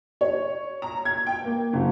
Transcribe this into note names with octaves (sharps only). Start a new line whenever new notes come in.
C#5
A#5
G#6
G5
A#3
F#1